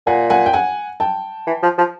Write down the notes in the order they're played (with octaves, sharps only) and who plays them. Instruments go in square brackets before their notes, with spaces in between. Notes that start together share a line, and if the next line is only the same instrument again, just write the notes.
[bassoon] A#2 [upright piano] F#5 G#5
[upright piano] F#5 G#5
G5
F#5 G#5
G5 A5
[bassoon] E3
F3
F3